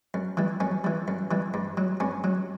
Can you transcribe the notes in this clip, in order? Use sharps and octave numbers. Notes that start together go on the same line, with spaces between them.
F#2
E3 G3
F#2 C#4
E3 G3
F#2
E3 G3
G2
F#3
G2 C#4
F#3